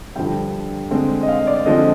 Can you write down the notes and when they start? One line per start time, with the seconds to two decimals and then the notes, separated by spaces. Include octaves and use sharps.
0.16 G2 D3 F3 G5
0.91 D3 G#3 C4
1.23 D#5
1.28 F5
1.47 D5
1.66 D3 F3 G#3 C4 D#5